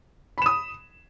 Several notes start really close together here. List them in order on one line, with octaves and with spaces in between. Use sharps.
B5 E7 D#6